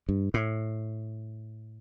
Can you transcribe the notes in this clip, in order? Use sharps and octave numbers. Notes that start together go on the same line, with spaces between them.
G2
A2